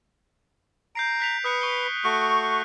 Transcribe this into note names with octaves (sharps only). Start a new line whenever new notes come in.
A#5 G6 C7 D7
F#6 B6 F7
B4 D#6 F#6 C#7
C#6 G7
A3 F#4 C#6 F#6 D7